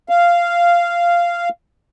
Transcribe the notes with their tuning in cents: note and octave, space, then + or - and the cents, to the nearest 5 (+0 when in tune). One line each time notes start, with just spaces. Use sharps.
F5 -10